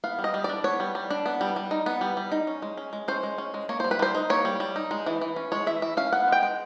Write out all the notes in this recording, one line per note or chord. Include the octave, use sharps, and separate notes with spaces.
B3 F5
G3
D#5
G3
D4 D5
B3 C#5
G3
G3
D4
B3
G3
G3
D#4
B3
G3
G3
D#4
C#4
G#3
C#4
G#3
C#4 C5
G#3
C#4
G#3
A#3 C#5
G3 C5
B4
G3 C5
D#4
A#3 C#5
G3
G3
D#4
G#3
E3
E3
C#4
G#3 C#5
E3 E5
E3 E5
C#4 F5
B3 F#5
G#3 G5
G#3